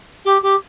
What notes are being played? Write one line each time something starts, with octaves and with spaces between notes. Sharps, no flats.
G4
G4